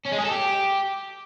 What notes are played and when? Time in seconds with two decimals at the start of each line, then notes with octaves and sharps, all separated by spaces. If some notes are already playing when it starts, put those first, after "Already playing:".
0.05 C#4
0.12 G#3
0.18 G#4
0.25 A4
0.31 G4